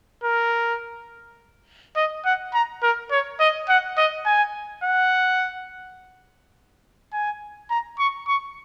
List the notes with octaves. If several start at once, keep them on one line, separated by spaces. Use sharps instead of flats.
A#4
D#5
F#5
A#5
A#4
C#5
D#5
F#5
D#5
G#5
F#5
G#5
A#5
C#6
C#6